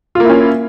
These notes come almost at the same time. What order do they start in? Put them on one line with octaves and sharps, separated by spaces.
F4 A#3 E4 C#4